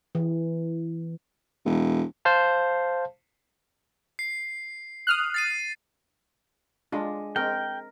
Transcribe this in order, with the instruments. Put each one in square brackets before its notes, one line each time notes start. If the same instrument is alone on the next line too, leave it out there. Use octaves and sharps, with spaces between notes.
[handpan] E3
[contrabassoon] E1
[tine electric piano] C5 F5 A5
[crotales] C7
[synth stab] D#6 F6 F#6
[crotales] A6 C7 D#7
[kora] G#3 [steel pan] D4 F4
[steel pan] G#3 C4 [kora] A#4 [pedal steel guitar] G5